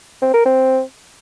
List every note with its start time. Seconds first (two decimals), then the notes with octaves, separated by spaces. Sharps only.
0.22 C4
0.34 A#4
0.45 C4